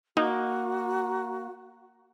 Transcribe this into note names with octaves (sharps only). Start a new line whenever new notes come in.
A#3 D#4 F#4